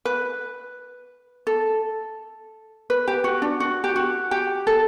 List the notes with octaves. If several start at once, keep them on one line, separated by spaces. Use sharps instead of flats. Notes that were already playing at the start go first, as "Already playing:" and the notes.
B4
A4
B4
G4
F#4
D4
F#4
G4
F#4
G4
A4